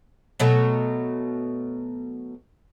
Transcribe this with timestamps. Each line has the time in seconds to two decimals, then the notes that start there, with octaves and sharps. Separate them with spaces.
0.40 B2 F#3 A3